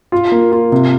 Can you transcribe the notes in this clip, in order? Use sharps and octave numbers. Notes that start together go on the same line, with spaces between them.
F4
A#3
F4
C3